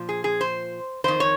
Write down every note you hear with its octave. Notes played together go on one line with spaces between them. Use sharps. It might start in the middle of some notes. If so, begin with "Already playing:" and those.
Already playing: A#2 F3
G#4
G#4
C5
F2 D#3 C5
C#5